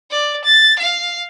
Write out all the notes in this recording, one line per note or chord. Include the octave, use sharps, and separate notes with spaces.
D5
A6
F5